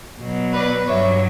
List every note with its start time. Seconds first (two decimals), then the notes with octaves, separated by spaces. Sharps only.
0.20 B2 F#3
0.53 B4 D5
0.87 G2 F#3 C#5 E5